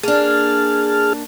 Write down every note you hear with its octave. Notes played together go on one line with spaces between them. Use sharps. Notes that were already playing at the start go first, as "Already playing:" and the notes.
A#3 D4 G#4 A5 F6